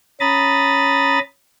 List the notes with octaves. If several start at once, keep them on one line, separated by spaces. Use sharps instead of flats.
C#4 A#5 B5 D#6 A6